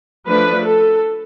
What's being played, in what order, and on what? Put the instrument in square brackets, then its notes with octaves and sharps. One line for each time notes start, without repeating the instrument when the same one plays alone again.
[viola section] F3 A3 D4 B4
A4